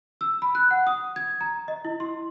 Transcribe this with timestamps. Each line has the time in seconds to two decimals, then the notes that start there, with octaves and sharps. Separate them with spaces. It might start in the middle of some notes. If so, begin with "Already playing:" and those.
0.21 E6
0.42 B5
0.55 F#6
0.71 F#5
0.87 D#6
1.16 G#6
1.41 A#5
1.68 D#5
1.85 E4
2.00 C6